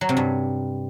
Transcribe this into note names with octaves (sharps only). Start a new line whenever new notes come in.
F#3
C3
G2